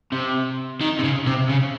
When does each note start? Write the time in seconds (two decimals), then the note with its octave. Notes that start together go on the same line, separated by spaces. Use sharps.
0.12 C3
0.81 D#3
0.99 C3
1.04 C#3
1.27 C3
1.49 C#3